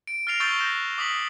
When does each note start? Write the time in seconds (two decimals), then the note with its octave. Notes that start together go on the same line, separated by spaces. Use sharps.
0.07 D7
0.27 F6 A6 A#6 C7 D7 F7
0.40 C#6 E6 G6 A6 D7 G7
0.59 F#6 G6 A#6 E7 F7
0.98 D6 D#6 B6 F#7